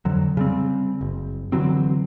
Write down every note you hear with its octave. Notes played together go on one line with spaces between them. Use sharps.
F2 D3 F#3
C#3 G3 C4
F#1
D3 E3 F#3 C4